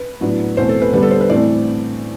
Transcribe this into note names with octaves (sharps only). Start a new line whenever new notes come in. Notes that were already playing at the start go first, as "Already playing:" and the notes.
Already playing: B4
A2 F#3 B3 D4
E2 B2 A3 C4 C5
A4
B4
D3 G3 B3 D4 B4
A4
C5
B4
A2 E3 A3 C4 D5